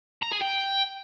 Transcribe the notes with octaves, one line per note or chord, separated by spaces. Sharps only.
A#5
G#4
G5